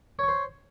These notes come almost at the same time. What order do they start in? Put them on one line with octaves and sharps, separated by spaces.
C#5 C#6 C5